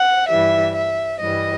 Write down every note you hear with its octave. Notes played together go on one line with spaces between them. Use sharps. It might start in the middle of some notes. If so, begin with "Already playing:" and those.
Already playing: F#5
G2 E3 G3 E5
E5
G2 E3 G3 D#5